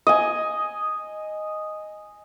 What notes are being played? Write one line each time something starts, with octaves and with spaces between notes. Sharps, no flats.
D#5 G#5